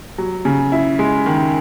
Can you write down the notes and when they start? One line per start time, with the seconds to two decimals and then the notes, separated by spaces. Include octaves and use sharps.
0.18 F#3
0.45 C#3
0.72 E4
0.99 G#3
1.26 D#3